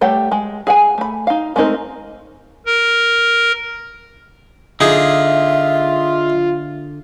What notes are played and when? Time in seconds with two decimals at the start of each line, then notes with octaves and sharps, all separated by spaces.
0.01 G3 A3 G4 C#5 F#5
0.32 G#3
0.67 G#4 F#5 G#5
0.98 A3 B5
1.27 D#4 F5
1.56 G#3 A3 C4 D#4 A#4
2.66 A#4
4.81 D3 D#4 F4 G#4 E5